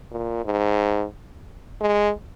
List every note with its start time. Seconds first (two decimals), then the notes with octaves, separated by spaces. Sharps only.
0.12 A#2
0.45 G#2
1.81 G#3